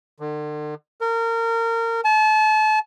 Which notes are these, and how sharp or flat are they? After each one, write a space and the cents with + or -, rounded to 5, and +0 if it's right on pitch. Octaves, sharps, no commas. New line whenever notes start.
D3 +40
A#4 -25
A5 -35